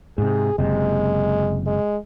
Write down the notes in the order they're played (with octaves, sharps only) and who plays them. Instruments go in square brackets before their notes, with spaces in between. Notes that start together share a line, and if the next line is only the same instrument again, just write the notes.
[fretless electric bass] G#2 C3 [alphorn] G#4
[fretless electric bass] F#1 C3 [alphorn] G#3
[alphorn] G#3